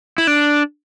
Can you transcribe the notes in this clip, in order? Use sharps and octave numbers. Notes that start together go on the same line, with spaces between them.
E4
D4